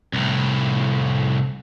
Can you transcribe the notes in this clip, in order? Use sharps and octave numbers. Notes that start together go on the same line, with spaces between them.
C2 A2